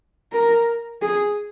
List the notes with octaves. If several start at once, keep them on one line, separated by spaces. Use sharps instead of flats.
A#4
G#4